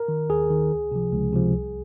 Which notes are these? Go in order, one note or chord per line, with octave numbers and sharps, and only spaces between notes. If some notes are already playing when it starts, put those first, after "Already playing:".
Already playing: A#4
D#3
D#2 G#4
D#3
C#2
C3 F3
C#2
C3 F3
C2